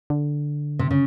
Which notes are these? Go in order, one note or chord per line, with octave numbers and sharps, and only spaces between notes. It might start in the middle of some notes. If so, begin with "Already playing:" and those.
D3
C3
C#3